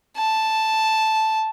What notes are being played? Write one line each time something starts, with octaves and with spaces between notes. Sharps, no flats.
A5